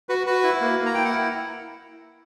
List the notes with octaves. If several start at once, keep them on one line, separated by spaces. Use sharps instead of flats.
F#4 B4
F#4 B4
E4
A#3
A#3
A#5
E4 G5
F#5